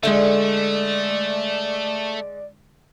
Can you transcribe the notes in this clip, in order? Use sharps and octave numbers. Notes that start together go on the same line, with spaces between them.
D3 G#3 A3 D5 E5 G5